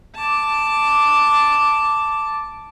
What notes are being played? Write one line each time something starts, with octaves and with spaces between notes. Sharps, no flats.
A5 D6